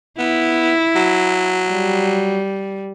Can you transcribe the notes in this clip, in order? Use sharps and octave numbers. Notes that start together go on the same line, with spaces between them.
B3 E4
F#3
G3